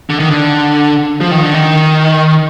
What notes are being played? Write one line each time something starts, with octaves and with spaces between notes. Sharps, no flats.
D3
D#3
D3
F3
D#3
D3
D#3